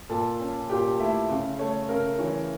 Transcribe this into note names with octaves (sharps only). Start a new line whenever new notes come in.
A#2 A4 A5
C#4
A#2 G4 G5
A3 E4 E5
C#3
A3 C#5
C#3 A#4
E3 C#5